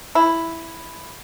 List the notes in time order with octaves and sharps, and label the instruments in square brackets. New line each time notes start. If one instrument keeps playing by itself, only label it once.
[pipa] E4